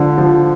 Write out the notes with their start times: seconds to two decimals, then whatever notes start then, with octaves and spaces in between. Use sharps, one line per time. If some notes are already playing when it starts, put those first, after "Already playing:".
Already playing: D3 F3
0.18 F3